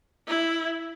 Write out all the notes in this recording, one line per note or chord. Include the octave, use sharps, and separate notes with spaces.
E4